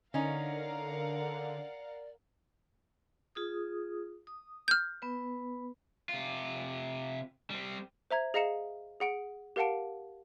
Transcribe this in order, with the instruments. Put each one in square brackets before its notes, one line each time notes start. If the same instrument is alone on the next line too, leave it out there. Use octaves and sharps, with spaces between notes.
[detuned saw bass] D3 [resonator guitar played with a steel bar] C#4 D#4 [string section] A#4 F5 F#5 [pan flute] D5
[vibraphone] F4 G#4 D#6
D#6
[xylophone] F6 G6
[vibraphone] B3 B4
[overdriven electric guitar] C3 F4
G3 C4
[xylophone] C5 E5 A#5 G#6
G#4 D#5 F5 A#5 C#7 E7
G#4 F#5 D7
G4 A#4 F5 F#5 A5 D7